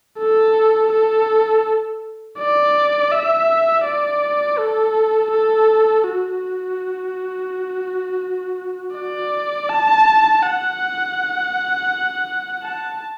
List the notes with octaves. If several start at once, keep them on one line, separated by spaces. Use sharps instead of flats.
A4
A4
D5
E5
D5
A4
A4
F#4
D5
A5
F#5
A5